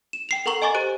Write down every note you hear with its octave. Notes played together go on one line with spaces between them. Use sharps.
E7
G5 C7 F7
A4 A#4 F#5 A#5 C#6 F#7
D#5 G#5 C#6 D6 A6
G4 C5 F#6 D7 F#7